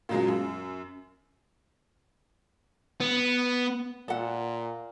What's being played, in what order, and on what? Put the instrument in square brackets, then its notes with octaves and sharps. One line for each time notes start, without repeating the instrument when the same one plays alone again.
[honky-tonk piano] A#2 C#3 F#3 G#3 A#3
F#2
[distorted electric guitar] B3
[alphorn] A#2 [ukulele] A4 F#5